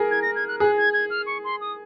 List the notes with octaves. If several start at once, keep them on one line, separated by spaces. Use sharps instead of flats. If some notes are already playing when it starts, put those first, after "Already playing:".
Already playing: G#4 A#4
G#6
A#6
G#6
F#6
G#4 F#6
G#6
G#6
F6
C#6
C6
D#6